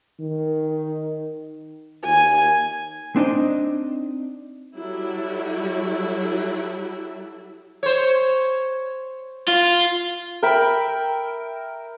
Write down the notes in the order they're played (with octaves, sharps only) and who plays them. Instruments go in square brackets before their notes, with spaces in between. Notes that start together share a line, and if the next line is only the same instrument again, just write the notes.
[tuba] D#3
[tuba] D#2 [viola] G#5
[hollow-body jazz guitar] C4 D4 D#4 D#5
[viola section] F#3 G3 E4 A4
[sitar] C5 C#5
[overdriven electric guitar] F4
[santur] A#4 E5 G5 B5